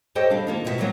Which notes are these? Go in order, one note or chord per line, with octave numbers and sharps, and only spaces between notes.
G4 A4 C5 C#5 D#5 G5
G3 D4 F5
D#3 A#3 F4
B2 D#4 E4 F#4 E5
A#2 D3 D#3 F#3 A#3 B3